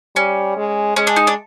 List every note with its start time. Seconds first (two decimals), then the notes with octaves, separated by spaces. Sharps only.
0.16 G3 C#4
0.57 G#3
0.96 G#3 C#4
1.07 D4
1.16 D#4
1.27 D4